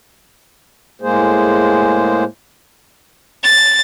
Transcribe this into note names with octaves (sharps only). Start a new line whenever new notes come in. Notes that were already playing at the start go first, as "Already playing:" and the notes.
A2 G#3 A#3 G#4 C5
A6